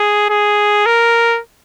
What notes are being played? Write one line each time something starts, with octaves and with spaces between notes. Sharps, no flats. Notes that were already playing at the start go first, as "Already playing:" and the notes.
Already playing: G#4
G#4
A#4